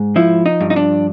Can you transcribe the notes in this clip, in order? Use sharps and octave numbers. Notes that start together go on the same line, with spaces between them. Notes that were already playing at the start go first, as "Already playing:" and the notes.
Already playing: G#2
F3 E4
D#4
G2
D#4
D4